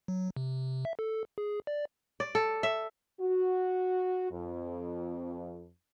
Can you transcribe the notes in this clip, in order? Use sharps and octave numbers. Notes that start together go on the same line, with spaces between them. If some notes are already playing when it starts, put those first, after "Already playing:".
F#3
C3
E5
A4
G#4
D5
D5
A4
E5
F#4
F2